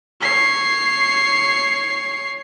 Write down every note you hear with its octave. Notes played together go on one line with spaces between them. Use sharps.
C#5 C7